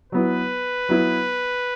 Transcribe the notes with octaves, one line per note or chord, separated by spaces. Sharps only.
F#3 B3 E4 B4
F#3 B3 E4